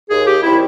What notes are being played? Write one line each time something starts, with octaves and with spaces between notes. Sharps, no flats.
D#2 G#4
G4
D#3 G3 C4 E4